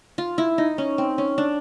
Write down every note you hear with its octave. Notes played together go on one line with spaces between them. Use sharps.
F4
E4
D#4
C#4
C4
C#4
D4